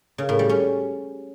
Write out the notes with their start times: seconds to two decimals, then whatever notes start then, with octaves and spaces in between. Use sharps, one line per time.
0.18 C#3
0.29 A2
0.39 G3
0.49 C#4